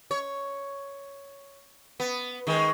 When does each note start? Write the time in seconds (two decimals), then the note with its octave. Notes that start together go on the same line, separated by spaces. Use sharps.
0.11 C#5
2.00 B3
2.47 D#3 G#3